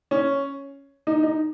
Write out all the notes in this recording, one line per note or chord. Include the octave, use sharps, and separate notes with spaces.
C#4
D#4
D#4